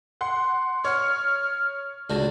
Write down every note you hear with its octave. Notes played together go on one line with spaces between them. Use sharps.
F#5 C6
C#5 C#6 F6
C#2 D3 F#4